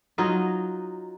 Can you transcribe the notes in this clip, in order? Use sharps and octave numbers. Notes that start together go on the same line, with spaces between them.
F#3 D#4 F4 D#5